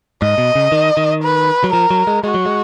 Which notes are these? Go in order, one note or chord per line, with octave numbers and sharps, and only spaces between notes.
G#2 D#5
B2
C#3
D#3
D#3
B4
F#3
F3 A#4
F#3
G#3
G#3 F#4
F#3
G#3